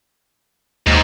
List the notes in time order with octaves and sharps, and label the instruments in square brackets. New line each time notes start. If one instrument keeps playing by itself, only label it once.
[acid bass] D#2 [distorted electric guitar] G#2